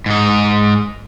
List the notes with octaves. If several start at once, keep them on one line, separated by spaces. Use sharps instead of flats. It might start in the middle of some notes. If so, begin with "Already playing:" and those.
G#2 D#4